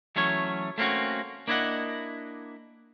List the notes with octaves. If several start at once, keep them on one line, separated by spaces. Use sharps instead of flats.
E3 F#3 A3 C#4 C#5
A3 A#3 C4 C#4 F#4
A#3 D4 E4 B4 D#5 F#5